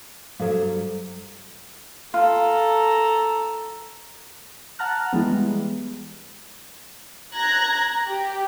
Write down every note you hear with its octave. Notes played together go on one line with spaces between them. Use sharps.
G2 F#3 G3 A4 C5 F5
F4 A4 A#5
F#5 A5 A#5 F6 F#6
E3 G3 G#3 B3
A#5 F#6 G#6 A#6
G4